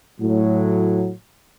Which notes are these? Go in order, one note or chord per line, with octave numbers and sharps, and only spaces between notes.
A2 F#3